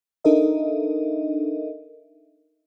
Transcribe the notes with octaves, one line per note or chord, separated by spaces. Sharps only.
D4 D#4 A4 A#4 D#5 E5